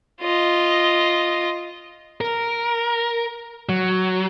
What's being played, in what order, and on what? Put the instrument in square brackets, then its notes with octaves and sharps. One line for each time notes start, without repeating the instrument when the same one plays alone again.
[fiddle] F4 D#5
[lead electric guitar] A#4
F#3